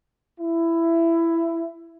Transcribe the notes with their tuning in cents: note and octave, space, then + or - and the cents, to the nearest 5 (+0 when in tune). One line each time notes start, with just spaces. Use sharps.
E4 +15